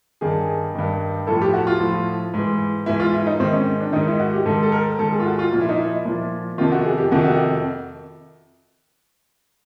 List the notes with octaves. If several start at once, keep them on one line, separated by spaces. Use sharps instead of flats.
G2 D#3 G#4
G2 D#3
A2 F3 A4
G4
F#4
F4
A2 F3
G#2 E3
G#2 E3 E4
F4
E4
D#4
G#2 D#3 C4
C#4
D4
G#2 D#3 D#4
E4
F#4
G4
G#2 D#3 A4
A4
A#4
G#2 D#3 A4
G#4
F4
F#4
F4
A#2 F3 F4
E4
D#4
E4
A#2 F3
F2 C3 D#3 F4
F#4
G#4
G4
F2 C3 D#3 F#4
F#4